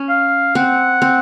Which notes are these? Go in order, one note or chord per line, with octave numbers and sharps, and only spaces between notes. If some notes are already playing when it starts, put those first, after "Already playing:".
Already playing: C#4
F5
C4 F#5
C4